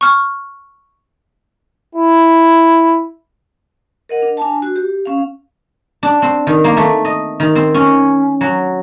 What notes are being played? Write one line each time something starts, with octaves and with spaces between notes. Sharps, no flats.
C#6 F6
E4
A#4 D#5 F#5
D4
D4 G#5 A5
F#4
G4
C#4 F5
D4
C4
D#3
A#3
A3
D#5
D#3
C4
C#4
F#3